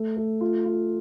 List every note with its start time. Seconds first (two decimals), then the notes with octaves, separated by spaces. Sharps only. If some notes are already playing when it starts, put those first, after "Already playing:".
Already playing: A3
0.17 A3
0.41 F4
0.66 F4